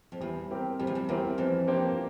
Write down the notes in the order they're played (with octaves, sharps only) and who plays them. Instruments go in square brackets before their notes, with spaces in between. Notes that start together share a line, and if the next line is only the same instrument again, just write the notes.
[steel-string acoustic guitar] F2
[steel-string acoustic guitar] E2 [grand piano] G3
[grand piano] C4 G4 A#4
[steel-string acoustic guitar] F2 [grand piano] G3
[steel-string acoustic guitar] E2
F2
[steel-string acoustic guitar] E2 [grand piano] C4 G4 A#4
[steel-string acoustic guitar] F2 [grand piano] E3
[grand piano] A#3 D4 G4 C5